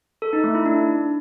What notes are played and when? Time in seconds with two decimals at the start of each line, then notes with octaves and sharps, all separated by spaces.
0.22 A4
0.33 D#4
0.44 A3
0.55 E4
0.66 D4